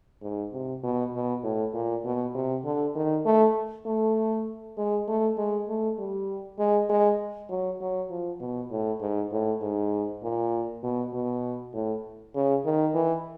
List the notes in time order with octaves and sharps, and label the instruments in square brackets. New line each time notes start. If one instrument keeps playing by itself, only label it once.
[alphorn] G#2
C3
B2
B2
A2
A#2
B2
C3
D3
D#3
A3
A3
G#3
A3
G#3
A3
G3
G#3
G#3
F#3
F#3
F3
B2
A2
G#2
A2
G#2
A#2
B2
B2
A2
C#3
D#3
E3